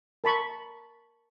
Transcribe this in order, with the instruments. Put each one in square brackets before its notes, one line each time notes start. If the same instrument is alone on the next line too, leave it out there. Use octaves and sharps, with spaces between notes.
[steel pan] A#4 A5 B5 C#6